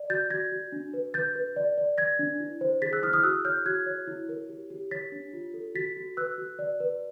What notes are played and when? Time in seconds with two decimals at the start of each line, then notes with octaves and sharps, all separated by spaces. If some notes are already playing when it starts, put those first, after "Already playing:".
Already playing: D5
0.10 F#4 G6 A6
0.30 F#4 G#6 A#6
0.52 F#4
0.72 D4
0.94 B4
1.14 B4 G6 A6
1.35 B4
1.56 D5
1.78 D5
1.98 D5 G#6 A#6
2.19 D4
2.40 E4
2.61 C5
2.82 G#4 A6 B6
2.93 E6 F#6
3.03 E4 D#6 F6
3.13 D#6 F6
3.23 F#4 E6 F#6
3.45 C#5 F6 G6
3.66 F#4 F#6 G#6
3.86 C#5
4.07 E4
4.29 A#4
4.49 G4
4.70 G4
4.91 C#5 A6 B6
5.12 D4
5.33 F4
5.54 A4
5.75 F#4 A6 B6
5.97 F#4
6.17 B4 E6 F#6
6.38 F#4
6.59 D5
6.80 B4